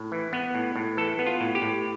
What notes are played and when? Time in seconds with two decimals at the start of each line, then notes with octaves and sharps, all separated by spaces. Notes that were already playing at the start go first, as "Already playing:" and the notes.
Already playing: A2
0.12 E3
0.33 B3
0.55 A2
0.76 A2
0.97 E3 A4
1.19 B3
1.26 F4
1.41 A2
1.55 G4
1.62 A2